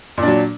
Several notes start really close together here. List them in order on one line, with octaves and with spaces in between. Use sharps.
A#2 D4 F#3